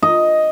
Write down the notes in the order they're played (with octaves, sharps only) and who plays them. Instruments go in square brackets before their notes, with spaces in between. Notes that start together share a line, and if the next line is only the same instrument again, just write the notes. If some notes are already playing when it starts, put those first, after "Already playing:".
[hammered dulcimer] D#5